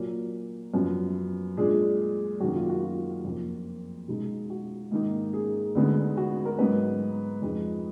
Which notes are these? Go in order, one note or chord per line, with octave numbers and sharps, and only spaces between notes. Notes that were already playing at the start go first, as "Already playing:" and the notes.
Already playing: A#2 F#3 A#3
F#2 F3 B3
A#2 G#3 D4 G#4
F#2 D#3 A#3 F#4
F4
F#4
F4
F2 F3 A#3
B2 G#3 D#4
F#4
G#2 D#3 A#3 D#4
G#4
D2 D3 G#3 B3 D#4
F#4
A#4
G#2 F#3 B3 D#4 B4
F2 F3 G#3 D#4